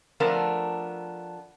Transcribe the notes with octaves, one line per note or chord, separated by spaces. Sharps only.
F3 A3 B3 D4 A4 A#4